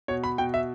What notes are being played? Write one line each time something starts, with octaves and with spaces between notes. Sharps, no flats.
B2 C#5
B5
B2 G5
E5